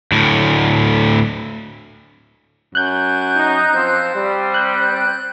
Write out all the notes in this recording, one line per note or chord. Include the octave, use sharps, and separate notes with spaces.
D2 A2
F#2 F#6 G6
D#4
F3 C4
G3
F#6 G6